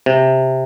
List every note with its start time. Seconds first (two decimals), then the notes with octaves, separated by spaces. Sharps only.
0.06 C3